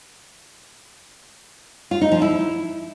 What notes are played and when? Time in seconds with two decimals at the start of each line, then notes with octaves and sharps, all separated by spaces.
1.91 F4
2.01 D#4
2.12 F3
2.22 E4